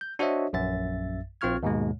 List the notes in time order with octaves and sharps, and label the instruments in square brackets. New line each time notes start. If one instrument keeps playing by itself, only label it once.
[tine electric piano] G6
D4 F#4 C5 C#5 D#5 E5
A#1 F#2 E5 A6
A#1 C4 F4 C#6 F6 G#6
D#2 G#2 B2 G#3